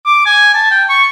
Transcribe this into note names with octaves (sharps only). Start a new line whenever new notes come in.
D6
G#5
A5
G5
C#6